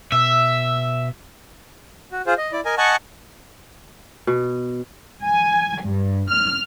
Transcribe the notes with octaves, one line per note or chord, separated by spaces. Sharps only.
B2 E5 E6
F#4
F4 G#4 C5
D#5
E4 D5
A#4 D#5 G#5
D#5 F#5 G#5 A5 C#6
B2
G#5
G2
F6